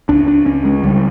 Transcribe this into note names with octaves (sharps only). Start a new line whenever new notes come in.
C#2 D4
D4
C#2 C#4
G#3
C#2 G3